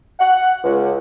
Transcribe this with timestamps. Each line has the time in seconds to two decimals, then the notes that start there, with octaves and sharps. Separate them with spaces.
0.20 F#5
0.64 C#2